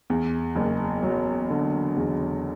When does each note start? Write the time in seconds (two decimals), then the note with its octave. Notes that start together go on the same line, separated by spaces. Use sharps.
0.10 E2
0.56 F#1
1.03 F#3
1.50 D3
1.97 E2